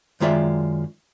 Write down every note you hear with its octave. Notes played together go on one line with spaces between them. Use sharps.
F#2 D#3 G#3 F4 D5 E5